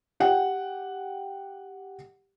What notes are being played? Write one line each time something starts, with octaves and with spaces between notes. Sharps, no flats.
G4 F#5 G5